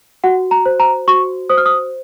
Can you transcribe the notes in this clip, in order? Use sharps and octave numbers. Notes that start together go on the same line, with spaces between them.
F#4 F#5
A#5
C5
A#5
F#4 C#6
C5 D#6
F6
D#6